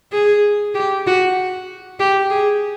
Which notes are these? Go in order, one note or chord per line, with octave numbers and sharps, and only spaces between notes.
G#4
G4
F#4
G4
G#4